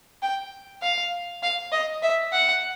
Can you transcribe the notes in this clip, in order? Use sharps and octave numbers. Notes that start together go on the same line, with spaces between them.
G5
F5
F5
D#5
E5
F#5